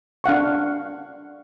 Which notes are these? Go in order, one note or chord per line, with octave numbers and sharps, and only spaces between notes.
D4 F5 F#5 C#6